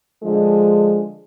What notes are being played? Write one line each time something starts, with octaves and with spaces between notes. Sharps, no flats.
D3 F3 G#3